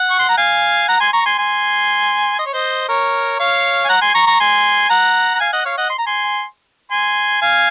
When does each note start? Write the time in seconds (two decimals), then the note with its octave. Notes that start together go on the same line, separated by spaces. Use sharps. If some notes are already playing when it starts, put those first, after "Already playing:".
Already playing: F#5
0.10 C#6
0.19 C6
0.29 A#5
0.37 F5 G#5
0.88 F#5 A#5
1.00 G#5 C6
1.13 A#5 C#6
1.25 G#5 C6
1.38 G#5 C6
2.39 D#5
2.46 C#5
2.53 C5 D#5
2.89 A#4 C#5
3.39 C#5 F5
3.85 G#5
3.89 F#5 A#5
4.01 G#5 C6
4.14 A#5 C#6
4.27 A#5 C#6
4.40 G#5 C6
4.90 F#5 A#5
5.35 A#5
5.40 F5 G#5
5.53 D#5 F#5
5.65 C#5 F5
5.77 D#5 F#5
5.90 C6
5.98 A#5
6.07 G#5 C6
6.91 G#5 C6
7.41 F5 G#5